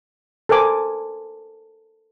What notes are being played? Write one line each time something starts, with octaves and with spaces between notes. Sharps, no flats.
A4 A#4 C5 G#5 D6